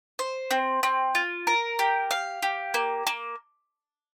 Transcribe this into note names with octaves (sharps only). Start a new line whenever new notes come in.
C5
C4
C4
F4
A#4
G4
F5
G4
A#3
A#3